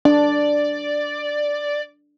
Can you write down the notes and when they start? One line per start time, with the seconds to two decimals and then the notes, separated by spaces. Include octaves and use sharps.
0.05 D4 D5